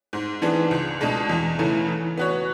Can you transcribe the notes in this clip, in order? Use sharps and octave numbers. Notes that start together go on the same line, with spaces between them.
G#2
E3 B3 D4 G#4
C#2
B2 G#3 D4
E2
C#3 E3 A3
E3
B3 F#4 C#5